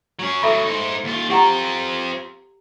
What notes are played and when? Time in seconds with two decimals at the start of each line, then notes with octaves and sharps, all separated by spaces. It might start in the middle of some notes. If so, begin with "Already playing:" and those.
0.19 F#3 C#4
0.43 F#3 A3 A4 E5 B5
0.65 D#4 C5
1.04 D#2 F4
1.30 C4 F4 G4 F#5 A#5